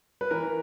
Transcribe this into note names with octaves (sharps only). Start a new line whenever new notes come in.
B4
E3 A#4